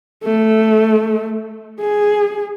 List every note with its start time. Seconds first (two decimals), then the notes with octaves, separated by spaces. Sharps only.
0.24 A3
1.81 G#4